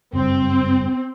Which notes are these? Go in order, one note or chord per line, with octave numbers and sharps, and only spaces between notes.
F#1 G2 C4